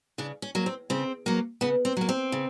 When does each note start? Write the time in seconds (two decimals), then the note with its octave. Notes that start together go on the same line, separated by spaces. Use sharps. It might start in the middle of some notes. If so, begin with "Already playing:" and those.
0.18 C#3 D4
0.42 C#4
0.55 F#3 A#3
0.66 C4
0.90 C#3 C4
1.26 F#3 A#3
1.61 C#3 B3
1.85 C4
1.97 F#3 A#3
2.09 C4
2.32 C#3